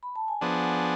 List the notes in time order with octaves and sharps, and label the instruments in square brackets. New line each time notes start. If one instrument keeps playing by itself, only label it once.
[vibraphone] B5
A5
G#5
[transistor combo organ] F3 B3 D4 G#4 [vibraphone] F#5